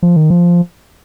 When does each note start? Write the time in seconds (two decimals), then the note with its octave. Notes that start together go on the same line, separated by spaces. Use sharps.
0.03 F3
0.16 D#3
0.30 F3